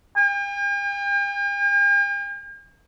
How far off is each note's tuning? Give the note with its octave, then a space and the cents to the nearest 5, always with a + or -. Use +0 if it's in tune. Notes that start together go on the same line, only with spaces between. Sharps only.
G5 +45